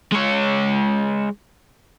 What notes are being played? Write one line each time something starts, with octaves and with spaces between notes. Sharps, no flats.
G#3 C#5